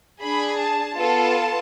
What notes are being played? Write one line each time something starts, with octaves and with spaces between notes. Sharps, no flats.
D4 G#4 B5
A5
B3 F4 A4